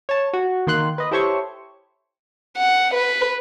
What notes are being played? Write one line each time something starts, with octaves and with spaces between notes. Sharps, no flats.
C#5 A5
F#4
D#3 A#3 C6 F#6
B4 D#5
E4 G4 A4 C5 C#5 C#6
F#5
B4